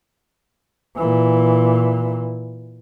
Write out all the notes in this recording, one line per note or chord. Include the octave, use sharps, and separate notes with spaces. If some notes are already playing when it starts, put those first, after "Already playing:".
A#2 E3